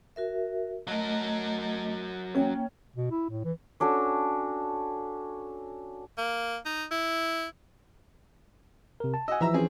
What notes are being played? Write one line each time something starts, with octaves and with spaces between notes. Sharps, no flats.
F#4 A#4 E5
F#3 A3 A#4 D#5
A#3 C#4 G5
B2
E4
A2
E3
C#4 D4 F#4 A4
A#3
D#4
E4
C3 A#4
A5
D#5 F#5 G#5 E6
E3 F3 E5 A#5 E6
C4 C#4 G#4